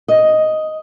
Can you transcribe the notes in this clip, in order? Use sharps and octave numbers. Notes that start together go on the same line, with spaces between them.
D#5